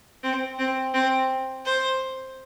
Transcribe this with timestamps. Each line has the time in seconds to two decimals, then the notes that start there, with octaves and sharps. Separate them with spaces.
0.23 C4
0.59 C4
0.94 C4
1.65 C5